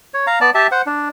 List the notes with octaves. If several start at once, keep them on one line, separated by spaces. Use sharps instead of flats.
C#5
F5 A#5
B3 D5 A5
G4 E5 A5
C5 F#5
D4